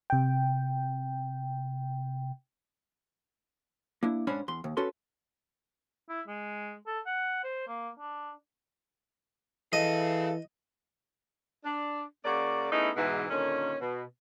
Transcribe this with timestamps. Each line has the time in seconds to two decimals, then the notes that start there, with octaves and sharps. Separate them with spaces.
0.10 C3 G5
4.03 A#3 D4 E4
4.27 G#2 C#4 D4 C5 C#5 B5
4.48 E2 C6
4.64 D#2
4.77 C#4 F#4 A4 B4 C6
6.09 E4
6.28 G#3
6.87 A4
7.06 F#5
7.44 C5
7.68 A#3
7.99 D4
9.73 E3 G#4 A4 D#5 F5
11.65 D4
12.25 C#3 A#3 F#4 D5
12.72 A3 B3 C#4 D#4 E4 G#4
12.96 G#2 B2 E3
13.30 A#2 D3 D#3 C#4
13.81 B2